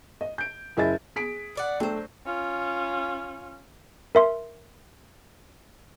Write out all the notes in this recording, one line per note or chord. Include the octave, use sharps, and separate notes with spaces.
D#5
G6 D7
F#1 E4 G#4 D#5 E5 A6
G#4 B6 D7
B2 D5 F#5
F#3 A3 D4 C5 G5
C#4 F4
A#4 E5 C6